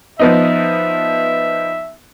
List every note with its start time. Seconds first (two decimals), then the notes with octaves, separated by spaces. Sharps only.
0.19 F3 B3 D#4 E5